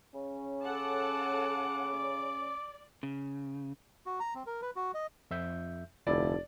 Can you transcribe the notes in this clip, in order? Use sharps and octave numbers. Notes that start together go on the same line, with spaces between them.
C#3 C#4
A4 F#5 A5 D6
D5
C#3
F#4
A#5
C4
A#4
B4
F#4
D#5
F2 E5 G6
F1 D2 E4 D5 A5